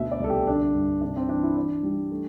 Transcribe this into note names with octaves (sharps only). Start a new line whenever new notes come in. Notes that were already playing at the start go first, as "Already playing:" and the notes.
Already playing: D2 B2 E5
D5
C2 A4
G4
D3 D4
G2
C3 D4
C4
E3 D4
E4
E3 D4
G3
A3